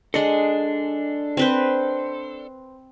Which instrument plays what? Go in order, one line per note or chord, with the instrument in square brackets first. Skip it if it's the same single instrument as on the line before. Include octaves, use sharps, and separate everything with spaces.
[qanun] G#3 D#5 [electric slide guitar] D4 A4
[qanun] C4 B4 C5